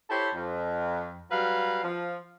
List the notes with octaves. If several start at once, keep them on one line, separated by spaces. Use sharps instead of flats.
E4 G4 A4 C5 C#5
F2
F#3 G3 B4 F5
F3